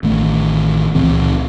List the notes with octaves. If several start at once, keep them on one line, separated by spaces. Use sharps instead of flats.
A1 D#3 A3
C#2 A#2 E3 C4